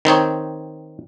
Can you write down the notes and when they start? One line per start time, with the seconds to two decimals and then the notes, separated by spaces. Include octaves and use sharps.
0.05 D#3 C4 D#4 C#5